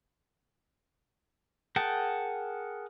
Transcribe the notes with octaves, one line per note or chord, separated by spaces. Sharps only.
G#4 A#4 F#5 G5 A5